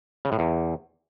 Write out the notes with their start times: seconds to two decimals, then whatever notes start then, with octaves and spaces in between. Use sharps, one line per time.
0.25 C#3
0.32 A2
0.39 E2